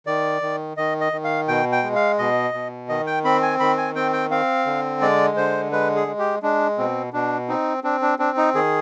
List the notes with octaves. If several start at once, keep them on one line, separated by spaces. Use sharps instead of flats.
D#3 D5
D#3
D#3 D#5
D#5
D#3
F5
B2 G5
G5
G#3
F5
B2 D#5
B2
D#3 D#5
G5
C4 B5
G#5
D#3 B5
G#5
C4 G5
G5
C4 F5
D3
G#3 D5
D3 C5
G#3 B4
G#4
G#3
G4
G#3 D4
B2 C4
B2 D4
C4 D#4
C4 D4
D4
C4 D4
D#4
D#3 G#4